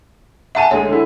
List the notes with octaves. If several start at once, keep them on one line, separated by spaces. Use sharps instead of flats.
E5 F#5 G#5 A5 D#7
D2 G#3 G#4 C#5
D3 E4